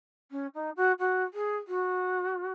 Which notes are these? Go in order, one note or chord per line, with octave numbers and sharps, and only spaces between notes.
C#4
D#4
F#4
F#4
G#4
F#4